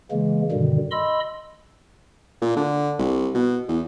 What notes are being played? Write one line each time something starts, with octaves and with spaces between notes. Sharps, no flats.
C#3 E3 G#3 A#3
G2 B2 D3 D#3 G3
D#5 B5 C6 E6
A#2
D3
C2
B2
E2